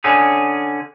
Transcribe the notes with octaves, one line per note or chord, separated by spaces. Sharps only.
D3 C#4 G#4